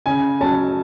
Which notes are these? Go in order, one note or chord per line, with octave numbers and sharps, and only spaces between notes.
C#3 G#5
F#3 C#4 A5